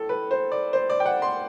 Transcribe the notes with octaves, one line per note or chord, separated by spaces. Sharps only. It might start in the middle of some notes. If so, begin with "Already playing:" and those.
Already playing: A2 A4
B4
C5
D5
C5
D5
G5
F#5
C6